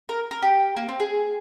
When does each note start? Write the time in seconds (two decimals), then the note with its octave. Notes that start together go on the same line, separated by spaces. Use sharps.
0.09 A#4
0.31 A#4
0.42 G4
0.77 A#3
0.89 C4
1.00 G#4